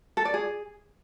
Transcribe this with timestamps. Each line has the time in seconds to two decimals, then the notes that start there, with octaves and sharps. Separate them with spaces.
0.17 A4
0.25 D5
0.34 G#4